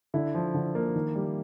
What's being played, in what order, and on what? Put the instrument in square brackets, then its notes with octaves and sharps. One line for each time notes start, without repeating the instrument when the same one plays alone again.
[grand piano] D3 E4
F3
D3
A#3
D#3
G3